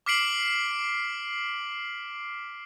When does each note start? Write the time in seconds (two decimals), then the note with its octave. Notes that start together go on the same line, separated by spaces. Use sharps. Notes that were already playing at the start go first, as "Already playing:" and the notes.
0.06 D6 F6 B6 C7 D7 F#7